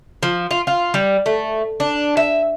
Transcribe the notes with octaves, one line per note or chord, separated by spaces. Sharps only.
F3
F4
F4
G3
A3
D4
E5